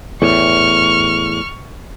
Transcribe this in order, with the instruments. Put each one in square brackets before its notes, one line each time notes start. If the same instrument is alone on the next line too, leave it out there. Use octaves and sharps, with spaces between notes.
[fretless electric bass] E2 A2 [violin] C#6 F6